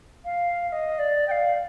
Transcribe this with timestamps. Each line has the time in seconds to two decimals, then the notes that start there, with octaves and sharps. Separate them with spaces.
0.24 F5
0.68 F5
0.72 D#5
0.98 D5
1.27 G5
1.31 F5